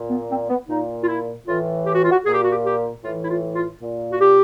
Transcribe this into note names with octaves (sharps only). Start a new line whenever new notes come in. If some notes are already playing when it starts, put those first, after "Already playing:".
Already playing: A#2
B3
C4
B3
A#2 D#4
F4
E4
A2 E3 F4
G4
F#4
F4
F#4
A#2 G#4
G4
F#4
G4
G4
A2 E3 F4
E4
F4
F4
A#2
F#4
G4